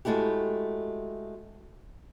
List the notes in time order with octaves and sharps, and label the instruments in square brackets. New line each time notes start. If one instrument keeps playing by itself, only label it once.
[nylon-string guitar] G#3 A3 E4 F#4 G4